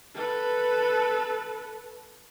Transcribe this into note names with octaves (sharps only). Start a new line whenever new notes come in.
A4 B4